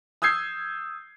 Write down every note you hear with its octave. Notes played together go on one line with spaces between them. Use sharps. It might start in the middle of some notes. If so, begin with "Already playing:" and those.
D#6 E6 G6 G#6 C7